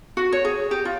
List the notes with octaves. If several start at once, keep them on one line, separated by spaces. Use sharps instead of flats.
F#4
C#5
G#4
G4
F4